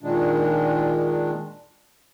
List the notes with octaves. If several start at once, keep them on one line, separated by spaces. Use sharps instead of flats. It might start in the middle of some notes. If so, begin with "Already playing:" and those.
A#2 D#3 G#3 D4